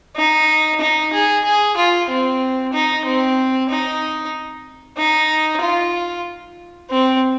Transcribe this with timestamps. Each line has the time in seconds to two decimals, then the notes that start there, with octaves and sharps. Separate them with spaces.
0.16 D#4
0.81 D#4
1.13 G#4
1.45 G#4
1.77 F4
2.09 C4
2.74 D#4
3.05 C4
3.70 D#4
4.98 D#4
5.62 F4
6.90 C4